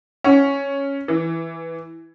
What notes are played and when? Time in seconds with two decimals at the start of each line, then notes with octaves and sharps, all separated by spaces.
0.24 C#4
1.08 E3